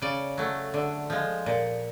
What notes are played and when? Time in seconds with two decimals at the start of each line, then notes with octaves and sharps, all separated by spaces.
0.02 C#3 D5
0.38 F#3 A3
0.74 D3
1.10 F3 G#3
1.46 A#2